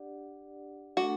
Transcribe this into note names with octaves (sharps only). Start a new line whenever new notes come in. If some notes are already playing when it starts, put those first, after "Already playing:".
Already playing: D4 G4 D5 F#5
A3 D4 F#4 A4